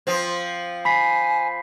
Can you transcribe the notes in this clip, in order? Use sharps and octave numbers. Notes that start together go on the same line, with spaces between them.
F3 C4
G#5 B5 B6 C7